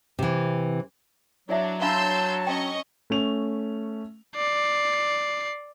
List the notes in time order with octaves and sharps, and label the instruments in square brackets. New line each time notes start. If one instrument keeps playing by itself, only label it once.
[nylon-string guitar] C3 E3
[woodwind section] F#3 [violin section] D4 [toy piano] E4 D5 E5
[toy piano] D4 F5 B5 [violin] A5 [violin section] C6 E6 G6
[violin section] C#4 D#5 C#6 [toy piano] G5
[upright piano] A3 C#4 F7
[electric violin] D5 C7